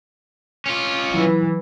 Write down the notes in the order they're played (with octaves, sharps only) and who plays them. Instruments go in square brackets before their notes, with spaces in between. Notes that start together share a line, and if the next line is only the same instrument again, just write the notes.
[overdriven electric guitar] C#4 F4
[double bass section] E3 [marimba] F#3